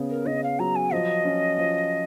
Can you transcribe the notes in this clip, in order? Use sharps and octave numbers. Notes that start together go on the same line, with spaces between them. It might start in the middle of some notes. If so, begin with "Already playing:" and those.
Already playing: C#3 B3
A#4
C#3 D#5
F5
F#3 A#5
G#5
F3 D#5
C#4
F3